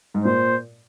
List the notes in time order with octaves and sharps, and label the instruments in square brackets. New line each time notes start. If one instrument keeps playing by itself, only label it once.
[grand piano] G#2
[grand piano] A#2 [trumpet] C5